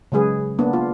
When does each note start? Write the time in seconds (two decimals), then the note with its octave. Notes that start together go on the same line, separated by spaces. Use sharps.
0.12 C#3 F#3 G#3 G#4 B4
0.59 A#3 B3 D4
0.73 F4